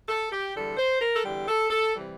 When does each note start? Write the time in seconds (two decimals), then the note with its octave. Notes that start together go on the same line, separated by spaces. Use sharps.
0.09 A4
0.32 G4
0.55 E2 D3 G3 A4
0.77 C5
1.00 A#4
1.15 A4
1.24 E2 D3 G3 G4
1.48 A4
1.70 A4
1.93 C3 E3 G3